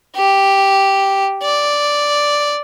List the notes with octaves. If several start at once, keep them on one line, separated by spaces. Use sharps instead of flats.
G4
D5